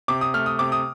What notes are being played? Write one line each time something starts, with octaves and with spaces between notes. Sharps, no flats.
C3 D6
D#6
A3 F6
D#6
C3 D6
D#6